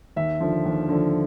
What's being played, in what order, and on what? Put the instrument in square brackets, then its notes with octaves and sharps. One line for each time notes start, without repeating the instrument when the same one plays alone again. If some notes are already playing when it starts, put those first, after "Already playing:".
[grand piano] D#2 E5
D3 F3
D#2
D3 F3